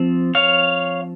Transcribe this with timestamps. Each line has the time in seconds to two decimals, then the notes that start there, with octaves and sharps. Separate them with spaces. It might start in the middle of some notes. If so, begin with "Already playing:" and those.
Already playing: F3 C4
0.35 C#5 F5